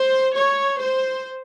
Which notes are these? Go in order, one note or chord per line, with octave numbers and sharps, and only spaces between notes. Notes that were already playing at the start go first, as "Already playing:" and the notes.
Already playing: C5
C#5
C5